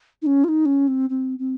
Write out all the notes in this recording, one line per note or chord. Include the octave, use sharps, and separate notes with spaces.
D#4
C#4
F4
D#4
C#4
C4
C4
C4